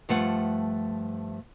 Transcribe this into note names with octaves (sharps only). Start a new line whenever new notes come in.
G2 F3 A3 F#5